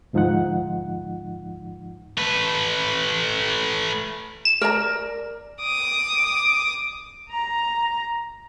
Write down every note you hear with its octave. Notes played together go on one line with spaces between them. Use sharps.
D2 G#2 F3 D#4 F4 F#5
A3 B4
E7
A#4 D5 A#5
D6 D#6
A#5